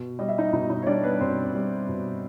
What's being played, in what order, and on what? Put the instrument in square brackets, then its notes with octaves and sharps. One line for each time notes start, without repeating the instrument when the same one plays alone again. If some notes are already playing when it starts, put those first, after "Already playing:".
Already playing: [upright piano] B2
G3 D#5
E5
D#4 D#5
B2 D#4 D#5
D#4 D#5
C#5
G3 D4 D5
B3 B4
B2 C4 C5
G3
B2